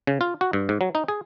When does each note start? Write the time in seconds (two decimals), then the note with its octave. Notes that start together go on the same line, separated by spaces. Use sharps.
0.07 C#3
0.21 F4
0.41 F#4
0.53 G2
0.69 G#2
0.81 F#3
0.95 D#4
1.08 G#4